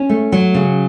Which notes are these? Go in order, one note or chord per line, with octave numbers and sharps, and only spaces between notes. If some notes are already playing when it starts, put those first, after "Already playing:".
Already playing: C#4
A3
F#3
C#3